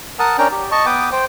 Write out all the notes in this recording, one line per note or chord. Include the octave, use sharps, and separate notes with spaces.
A#4 F#5 A5 D#6
C#4 D4 A#4 G5 A#5
G4
D#5 A5 C#6
B3 B4 G5 D6 D#6
C5 G5